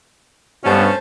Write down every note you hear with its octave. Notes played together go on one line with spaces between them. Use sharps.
G2 B2 A3 C#4 C5